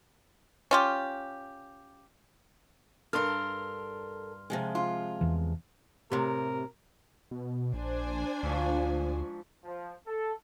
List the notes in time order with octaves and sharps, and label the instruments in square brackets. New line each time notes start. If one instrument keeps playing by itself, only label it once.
[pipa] C#4 F4 G4
[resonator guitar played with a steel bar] G2 [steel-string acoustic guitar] A4 A#4 [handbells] C6 F6
[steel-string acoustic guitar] C3 F3 G#3
[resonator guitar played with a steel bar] F4
[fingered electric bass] E2 E3
[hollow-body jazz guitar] A2 C3 [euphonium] G4 [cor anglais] A#4
[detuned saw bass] B2
[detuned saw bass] A#1 [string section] D4 C5 G#5
[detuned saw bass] D2 [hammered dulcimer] G#2 F3 C#6
[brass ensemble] F3
A4